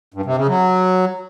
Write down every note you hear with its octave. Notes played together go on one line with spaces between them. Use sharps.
G2
C3
C#3
F#3